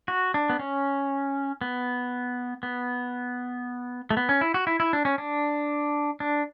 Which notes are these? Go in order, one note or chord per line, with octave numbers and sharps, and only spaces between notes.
F#4
D4
B3
C#4
B3
B3
A3
B3
C#4
E4
F#4
E4
E4
D4
C#4
D4
D4